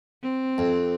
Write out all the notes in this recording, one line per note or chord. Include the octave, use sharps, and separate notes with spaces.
C4
F2